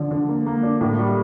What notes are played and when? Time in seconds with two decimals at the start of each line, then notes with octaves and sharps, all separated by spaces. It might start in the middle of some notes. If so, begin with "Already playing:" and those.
Already playing: D3 F3 D4
0.11 D3
0.29 A#3
0.47 A#3
0.63 D4
0.81 A2
0.99 G3